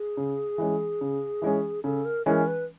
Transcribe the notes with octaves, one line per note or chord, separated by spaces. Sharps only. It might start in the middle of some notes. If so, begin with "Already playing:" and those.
Already playing: G#4
C#3
E3 G#3 C#4
C#3
E3 G#3 C#4
C#3 A4
A#4
E3 G#3 C#4 A#4
B4